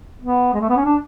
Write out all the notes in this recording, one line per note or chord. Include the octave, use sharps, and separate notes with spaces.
B3
G#3
A3
B3
C#4
D4